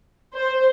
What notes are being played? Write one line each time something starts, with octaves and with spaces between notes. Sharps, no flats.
C5